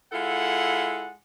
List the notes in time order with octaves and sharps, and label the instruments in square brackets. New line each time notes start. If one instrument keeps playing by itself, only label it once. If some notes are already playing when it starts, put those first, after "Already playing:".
[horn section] G#3 E4 F4 A4 F#5